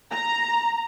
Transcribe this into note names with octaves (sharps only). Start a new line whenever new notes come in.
A#5